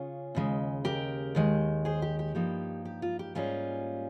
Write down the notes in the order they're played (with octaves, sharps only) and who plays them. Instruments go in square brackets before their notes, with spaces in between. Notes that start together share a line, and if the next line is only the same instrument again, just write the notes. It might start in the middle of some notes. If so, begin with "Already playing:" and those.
Already playing: [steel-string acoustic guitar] C#3 C#4 F4 G#4
D#2 C#3 G#3
G4 A#4
D#2 D#3 G#3
G#4 C5
G4
G4
G2 F3 A#3 D#4 G4
G4
F4
G4
G#2 G3 A#3 C#4 F4 G#4